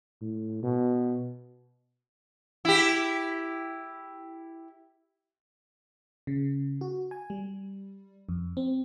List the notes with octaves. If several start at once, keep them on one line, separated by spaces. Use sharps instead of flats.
A2
B2
E4 G4
C#3
F#4
G#5
G3
F2
C4